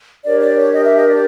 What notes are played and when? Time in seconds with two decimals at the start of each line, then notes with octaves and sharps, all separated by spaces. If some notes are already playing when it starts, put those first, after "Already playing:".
0.24 D4 G4 A#4 C#5 D5
0.40 D5
0.56 C#5
0.72 D#5
0.84 E5
0.96 D#5
1.08 D5